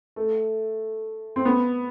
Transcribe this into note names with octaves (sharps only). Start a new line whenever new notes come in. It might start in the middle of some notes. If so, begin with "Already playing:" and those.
A3
C4
B3